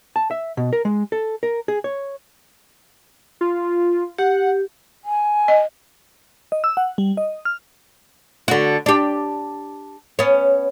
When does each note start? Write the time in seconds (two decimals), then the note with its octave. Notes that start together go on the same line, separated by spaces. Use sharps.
0.16 A5
0.31 E5
0.57 B2
0.73 A#4
0.85 G#3
1.12 A4
1.43 A#4
1.68 G#4
1.84 C#5
3.41 F4
4.18 G4 F#5
5.05 G#5
5.48 D#5
6.52 D#5
6.64 E6
6.77 F#5
6.98 G3
7.17 D#5
7.45 F6
8.48 D3 F#4
8.86 D4 G4
10.19 B3 C#4